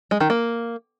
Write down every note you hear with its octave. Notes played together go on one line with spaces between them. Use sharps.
G#3
D#3
A#3